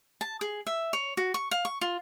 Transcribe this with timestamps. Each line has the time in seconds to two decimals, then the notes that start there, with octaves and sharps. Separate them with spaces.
0.21 A5
0.41 G#4
0.67 E5
0.93 C#5
1.17 F#4
1.34 C#6
1.51 F5
1.65 C#6
1.81 F4